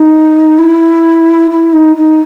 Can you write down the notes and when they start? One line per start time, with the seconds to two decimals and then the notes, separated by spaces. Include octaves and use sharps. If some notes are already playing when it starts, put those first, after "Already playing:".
Already playing: D#4
0.58 E4
1.50 E4
1.72 D#4
1.95 D#4